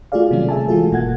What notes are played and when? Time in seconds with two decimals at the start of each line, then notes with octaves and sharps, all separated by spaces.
0.12 A3 F4 F#4 G#4 D5 F5
0.31 C3 D#3 F#3 G3 A3 C#4
0.49 G#4 E5 G#5 A5
0.68 E3 G#3 F4 F#4 A4
0.91 G1 B2 A#3 F#5 G#6